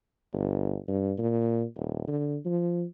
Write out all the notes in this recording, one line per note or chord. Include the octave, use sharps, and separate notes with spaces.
G1
G2
A#2
D#1
D3
F3